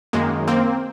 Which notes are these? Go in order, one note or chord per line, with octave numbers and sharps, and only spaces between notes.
F#2 D#3 G#3 A#3
A#3 C4